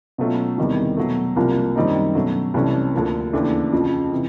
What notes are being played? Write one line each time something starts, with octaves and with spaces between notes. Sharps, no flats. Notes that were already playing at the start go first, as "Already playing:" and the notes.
B2 F#3 A3 C#4 F4
E2 C3 D#3 G3
B2 F#3 A3
C2 C3 F3 A#3
F#2 D#3 G3 C4 D#4
B2 F#3 A3 C#4
C2 C3 E3 A3 C#4
D2 D3 F3 A#3
D#2 C#3 E3 A3 D4
F2 C#3 F3
C3 E3